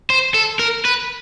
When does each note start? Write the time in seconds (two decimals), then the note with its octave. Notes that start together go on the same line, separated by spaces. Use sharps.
0.10 C5
0.34 A4
0.59 A#4
0.85 B4